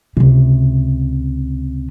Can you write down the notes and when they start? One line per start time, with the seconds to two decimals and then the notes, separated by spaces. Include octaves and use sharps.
0.17 C#2 C3